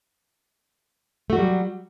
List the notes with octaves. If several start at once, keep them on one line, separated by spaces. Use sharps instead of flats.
F#3 G3 A3 F#4